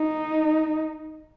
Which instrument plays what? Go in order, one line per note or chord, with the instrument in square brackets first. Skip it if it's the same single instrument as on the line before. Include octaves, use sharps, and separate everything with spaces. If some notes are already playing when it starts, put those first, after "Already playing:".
Already playing: [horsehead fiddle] D#4